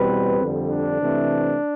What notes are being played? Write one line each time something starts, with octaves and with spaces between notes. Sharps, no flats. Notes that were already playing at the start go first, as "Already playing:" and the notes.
Already playing: E2 B2 G3 C4 B4
F2 D3 G3
D4
C3 E3 A3 C4